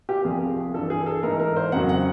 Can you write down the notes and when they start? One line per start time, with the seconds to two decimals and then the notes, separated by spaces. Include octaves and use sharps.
0.09 G4
0.24 C2 C3 F3 G#4
0.74 G2 E3 A4
0.90 G#4
1.06 A4
1.23 G#2 E3 A#4
1.40 A#4
1.56 C5
1.72 F2 C#3 F#3 F#5
1.89 F#5